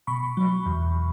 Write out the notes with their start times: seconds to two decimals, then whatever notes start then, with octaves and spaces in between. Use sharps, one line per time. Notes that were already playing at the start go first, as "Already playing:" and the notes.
0.07 B2 B5 C#6
0.37 F#3
0.66 E2